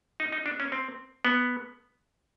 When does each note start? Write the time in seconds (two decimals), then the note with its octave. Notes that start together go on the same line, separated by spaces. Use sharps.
0.20 D#4
0.32 D#4
0.46 D4
0.60 C#4
0.72 C4
1.25 B3